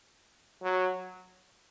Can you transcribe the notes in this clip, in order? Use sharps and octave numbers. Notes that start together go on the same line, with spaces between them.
F#3